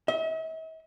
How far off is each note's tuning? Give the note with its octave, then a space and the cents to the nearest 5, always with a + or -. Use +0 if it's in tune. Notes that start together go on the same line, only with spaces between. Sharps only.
E5 -45